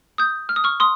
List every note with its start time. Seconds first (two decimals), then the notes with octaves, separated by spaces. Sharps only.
0.18 D#6 G6
0.49 F6
0.56 D#6
0.64 C#6 F6
0.80 C6 D#6